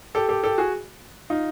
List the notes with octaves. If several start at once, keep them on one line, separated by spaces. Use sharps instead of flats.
G4 A4
G4 A4
G4 A4
F#4 G#4
D#4 F4